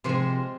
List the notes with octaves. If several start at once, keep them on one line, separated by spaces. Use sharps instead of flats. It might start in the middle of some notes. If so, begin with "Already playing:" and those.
C3 F3 G#3 C5